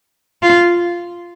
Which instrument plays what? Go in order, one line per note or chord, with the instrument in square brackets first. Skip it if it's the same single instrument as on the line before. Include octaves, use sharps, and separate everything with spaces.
[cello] F4